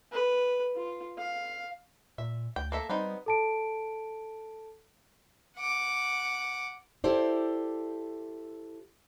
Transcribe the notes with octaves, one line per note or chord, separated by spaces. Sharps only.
B4
F4
F5
A#2 E5
D2 G5
A#3 A4 E5
G3 B3 C4 D#4
A4 A5 D7
F#5 D6
E4 G4 A4 C5 D5